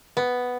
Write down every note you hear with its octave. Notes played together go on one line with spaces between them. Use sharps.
B3